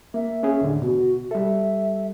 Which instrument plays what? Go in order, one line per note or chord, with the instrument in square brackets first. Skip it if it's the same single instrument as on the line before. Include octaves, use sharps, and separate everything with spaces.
[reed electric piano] A#3 [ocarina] E5
[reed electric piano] C#4 G#4
D#2 A2 D3
[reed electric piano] B2 [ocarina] F#4
[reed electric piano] G3 A4 [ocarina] E5